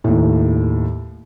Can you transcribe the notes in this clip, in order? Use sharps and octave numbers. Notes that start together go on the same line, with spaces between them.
D#2 A2